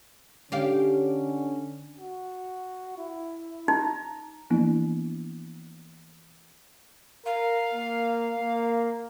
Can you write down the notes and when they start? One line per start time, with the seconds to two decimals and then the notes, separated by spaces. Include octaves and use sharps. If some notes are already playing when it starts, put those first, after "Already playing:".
0.52 D3 C#4 G4 F5
1.99 F#4
2.97 E4
3.68 D#4 A#5
4.50 E3 F3 A#3 B3 D4 E4
7.26 A#4 F5
7.74 A#3
8.37 A#3